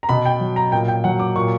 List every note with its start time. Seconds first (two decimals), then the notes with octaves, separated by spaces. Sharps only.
0.03 A#5
0.09 B2 B5
0.25 G5
0.40 F#3
0.56 A#5
0.72 A#2 G5
0.88 G5
1.04 F#3 F#5
1.19 D6
1.35 A#2 C#6